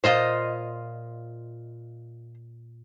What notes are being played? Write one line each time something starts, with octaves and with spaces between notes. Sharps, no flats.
A#2 F4 C5 D#5 F5